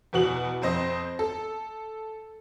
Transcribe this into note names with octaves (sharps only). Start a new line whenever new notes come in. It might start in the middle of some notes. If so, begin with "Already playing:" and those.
E2 B2 F#4 F#7
F2 C4 C5 D#5
A4